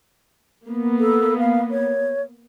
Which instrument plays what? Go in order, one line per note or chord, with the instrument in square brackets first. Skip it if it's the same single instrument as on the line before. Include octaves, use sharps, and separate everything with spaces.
[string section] A#3 B3
[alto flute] A4
F5
C#5